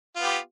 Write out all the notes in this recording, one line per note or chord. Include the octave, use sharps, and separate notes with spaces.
B3 F4 G4